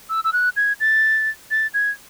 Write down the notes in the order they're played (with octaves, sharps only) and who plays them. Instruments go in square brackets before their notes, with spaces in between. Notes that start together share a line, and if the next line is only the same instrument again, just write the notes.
[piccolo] E6
E6
F#6
G#6
A6
A6
G#6